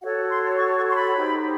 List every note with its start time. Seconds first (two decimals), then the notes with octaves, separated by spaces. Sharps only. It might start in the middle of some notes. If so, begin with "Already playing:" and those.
0.01 F#4 A4 C#5 F#5
0.29 C6
0.58 C#6
0.78 C#6
0.90 C6
0.96 B5
1.15 D#4 G4 C5